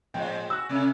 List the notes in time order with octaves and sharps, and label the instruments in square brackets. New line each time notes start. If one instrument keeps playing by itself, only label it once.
[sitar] A2 F3 G#3 [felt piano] G5
[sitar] F#4 [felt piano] E6 F#6
[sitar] C3 A3 C#4